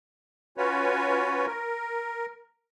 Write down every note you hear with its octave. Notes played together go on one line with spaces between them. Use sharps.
C#4 F4 F#4 B4 C#5
A#4